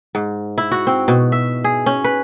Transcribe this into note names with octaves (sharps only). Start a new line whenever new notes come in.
G#2
E4
F#4
C4
B2
E5
G#4
C#4
B4